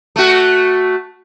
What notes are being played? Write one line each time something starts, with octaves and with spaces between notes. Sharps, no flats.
A3 F#4